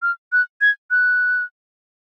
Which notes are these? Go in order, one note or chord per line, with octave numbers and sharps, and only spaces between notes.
F6
F#6
G#6
F#6